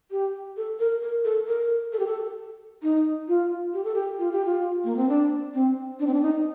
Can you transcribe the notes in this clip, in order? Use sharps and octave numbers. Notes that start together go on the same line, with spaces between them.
G4
A4
A#4
A#4
A4
A#4
A4
G4
A4
D#4
F4
G4
A4
G4
F4
G4
F4
A#3
C4
D4
C4
D4
C4
D4
D#4